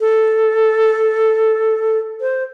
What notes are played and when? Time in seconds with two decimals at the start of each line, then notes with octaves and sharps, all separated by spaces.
0.01 A4
2.21 C5